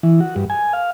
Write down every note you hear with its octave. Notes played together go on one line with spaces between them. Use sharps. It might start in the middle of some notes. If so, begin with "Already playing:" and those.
E3
F#4
G2
G#5
F5